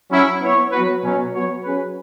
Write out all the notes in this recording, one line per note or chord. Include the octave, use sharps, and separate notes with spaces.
F#3 C#4 E4
B3 E4 C#5
F#3 B3 F#4 B4
B2 F#3 C#4
F#3 B3 F#4 C#5
F#3 C#4 G#4 B4